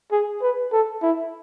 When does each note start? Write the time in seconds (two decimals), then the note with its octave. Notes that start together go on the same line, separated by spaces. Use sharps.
0.12 G#4
0.42 B4
0.72 A4
1.03 E4